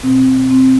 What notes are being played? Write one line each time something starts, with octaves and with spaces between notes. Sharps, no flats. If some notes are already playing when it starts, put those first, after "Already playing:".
B2 C4
C4